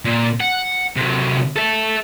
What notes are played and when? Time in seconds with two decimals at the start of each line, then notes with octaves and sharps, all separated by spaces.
0.05 A#2
0.40 F#5
0.96 C3 F#3
1.56 A4 E5